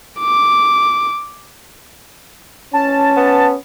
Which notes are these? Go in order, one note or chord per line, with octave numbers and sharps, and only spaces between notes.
D6
C#4 A5
B3